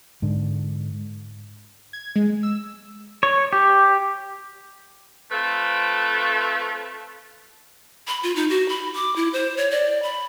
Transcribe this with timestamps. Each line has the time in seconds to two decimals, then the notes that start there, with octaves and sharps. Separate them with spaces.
0.22 G#2 D3 D4
1.93 G#6
2.16 G#3
2.43 E6
3.23 C#5
3.53 G4
5.31 A3 C4 F4 A4 B4
8.08 B5
8.23 F4
8.36 D#4
8.50 F#4
8.69 B5
8.95 D6
9.16 E4
9.33 C5
9.57 C#5
9.71 D5
10.03 B5